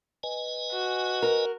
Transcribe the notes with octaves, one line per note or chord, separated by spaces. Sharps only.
B4 D#5 G#5
F#4
A#4